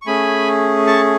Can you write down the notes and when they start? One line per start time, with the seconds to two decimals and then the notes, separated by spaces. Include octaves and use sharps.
0.02 C#6
0.07 A3 C#4 G#4 G#5 B5
0.87 A5 C#6